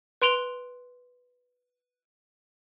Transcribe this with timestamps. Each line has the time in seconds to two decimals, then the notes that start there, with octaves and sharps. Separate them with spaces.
0.22 B4 C6 D7 F7 G7